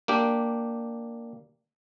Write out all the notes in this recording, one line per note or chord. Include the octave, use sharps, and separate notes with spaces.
A#3 D4 G4